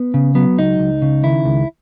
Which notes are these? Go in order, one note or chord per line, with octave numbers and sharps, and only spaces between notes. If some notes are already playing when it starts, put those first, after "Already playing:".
Already playing: B3
C#3
F#3 B3
C#2 D#4
C#2
C#3
D#3 E4
C#2